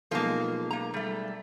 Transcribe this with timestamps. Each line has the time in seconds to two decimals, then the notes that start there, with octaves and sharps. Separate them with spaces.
0.11 B1 F3 G#3 A#3
0.71 A#3 A#5
0.94 G3 A3